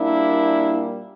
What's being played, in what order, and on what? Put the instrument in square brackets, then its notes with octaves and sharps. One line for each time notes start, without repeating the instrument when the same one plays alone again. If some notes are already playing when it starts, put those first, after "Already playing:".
Already playing: [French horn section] A#2 G3 A#3 D4 E4